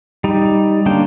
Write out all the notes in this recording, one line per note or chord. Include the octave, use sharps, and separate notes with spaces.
G3 D#4
D3 A#3 C#4 D4 G5